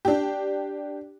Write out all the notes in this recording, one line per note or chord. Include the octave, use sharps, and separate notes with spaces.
D4 G4